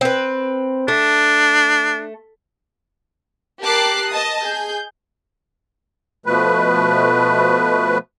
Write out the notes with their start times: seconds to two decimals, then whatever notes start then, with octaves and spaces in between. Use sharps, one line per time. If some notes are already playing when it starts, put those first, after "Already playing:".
0.01 C4 B4
0.88 A3 D4
3.62 G4 A#4 A5 D6 F#6 C7
4.11 D#5 A5 D#6
4.46 G#4 G6
6.26 B2 F3 A3 B4